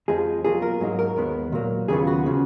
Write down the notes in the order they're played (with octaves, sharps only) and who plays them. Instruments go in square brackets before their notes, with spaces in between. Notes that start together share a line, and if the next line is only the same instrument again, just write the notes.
[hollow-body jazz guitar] F2 F3 G#3 G#4
B2 F#3 A#3 F4 G#4
A#4
G#2 F#3 A#3 D#4
A#4
D#2 D#3 G#3 B3
A#2 F#3 A#3
D#2 C#3 F#3 B3 F4 G#4
F#4
C#3 F3